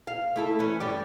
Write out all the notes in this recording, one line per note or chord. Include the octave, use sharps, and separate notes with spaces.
F5
A3 E4 A4
E3 C#4
G2 G3 G4